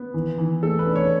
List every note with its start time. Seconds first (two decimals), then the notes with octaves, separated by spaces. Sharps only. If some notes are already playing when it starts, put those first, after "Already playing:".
Already playing: B3
0.14 E3
0.38 E3
0.63 A3 A4
0.79 B4
0.87 D4
0.96 C#5